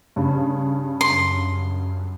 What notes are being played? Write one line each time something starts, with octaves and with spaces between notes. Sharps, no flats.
G2 C#3
F#2 C6